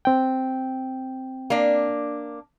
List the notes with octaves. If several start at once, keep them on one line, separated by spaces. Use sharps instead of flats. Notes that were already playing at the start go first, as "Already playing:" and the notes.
C4 G5
A#3 D4